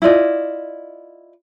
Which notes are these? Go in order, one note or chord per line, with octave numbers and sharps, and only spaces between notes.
E4 F4 D5 D#5